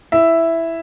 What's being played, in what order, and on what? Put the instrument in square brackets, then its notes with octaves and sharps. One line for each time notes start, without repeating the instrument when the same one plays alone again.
[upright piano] E4 E5